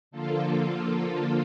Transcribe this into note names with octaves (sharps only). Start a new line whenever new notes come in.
D3 F3 A#3 F4 A4